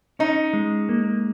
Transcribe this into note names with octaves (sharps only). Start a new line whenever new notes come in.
C#4 D#4
G#3
A#3